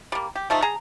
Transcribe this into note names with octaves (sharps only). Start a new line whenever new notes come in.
G3 A#3
G4
F3 A3 D#4
G#4 A#5